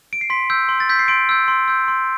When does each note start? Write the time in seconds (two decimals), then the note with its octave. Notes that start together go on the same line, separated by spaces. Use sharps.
0.13 D7
0.21 C7
0.30 C6 B6
0.50 E6 G6
0.69 C6
0.80 A6
0.89 E6 G6 B6
0.99 C7
1.08 C6 D7
1.29 E6 G6
1.48 C6
1.68 E6 G6
1.88 C6